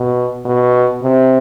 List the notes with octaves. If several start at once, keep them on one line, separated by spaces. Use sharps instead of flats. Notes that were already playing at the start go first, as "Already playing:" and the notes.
Already playing: B2
B2
C3